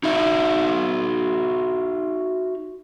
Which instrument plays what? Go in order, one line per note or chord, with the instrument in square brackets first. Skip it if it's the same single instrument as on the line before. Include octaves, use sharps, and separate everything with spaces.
[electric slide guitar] D#4 F#4 E5